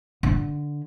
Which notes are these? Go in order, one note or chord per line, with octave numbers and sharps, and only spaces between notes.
D3